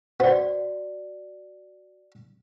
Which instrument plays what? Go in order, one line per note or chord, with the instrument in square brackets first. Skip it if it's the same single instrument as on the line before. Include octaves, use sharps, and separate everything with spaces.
[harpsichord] B3 C5 [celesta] F#4 D5